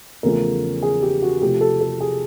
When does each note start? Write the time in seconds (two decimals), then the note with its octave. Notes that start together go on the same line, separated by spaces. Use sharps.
0.23 E2 C#3 F3 A3 C#4 A#4
0.83 G#4
1.02 G4
1.22 F#4
1.42 C3 F3 A3 C4 G4
1.61 A4
1.81 A4
2.01 G#4